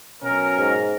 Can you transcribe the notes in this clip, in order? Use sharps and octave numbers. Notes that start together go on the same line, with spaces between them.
B2 F#3 C#4 A#4
G#2